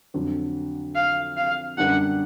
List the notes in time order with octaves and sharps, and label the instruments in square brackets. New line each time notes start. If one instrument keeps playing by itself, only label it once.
[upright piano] F2 D3 F#3
[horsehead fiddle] F5
F5
[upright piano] F#2 D3 G3 B3 D4 [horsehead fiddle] F#5